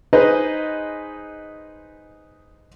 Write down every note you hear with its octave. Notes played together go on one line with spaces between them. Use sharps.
D#4 G#4 B4 C5 D#5